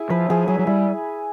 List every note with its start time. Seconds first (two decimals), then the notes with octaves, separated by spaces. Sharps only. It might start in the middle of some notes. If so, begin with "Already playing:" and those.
Already playing: E4 G#4
0.10 F3 B4
0.30 F3 G#4
0.48 F#3 G#4
0.59 F#3
0.67 G3 E4